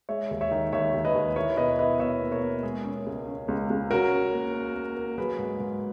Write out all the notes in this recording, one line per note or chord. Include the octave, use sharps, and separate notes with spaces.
G#3 C#5 E5
D#2
C#5 E5
D#3
D#2 C#5 E5
D#2
B4 D#5
D#2
E4 A#4 C#5
B2 B4 D#5
E4 B4 D#5
B2 C#5 E5
A#3
A#4 C#5
A#3
G#3 G#4
C#4
C#2
C#4
C#2
C#2
C#4 F#4 A#4
C#4
A#3
A#3
A#3
A#3
F#3 G#4 B4
G#2
G#2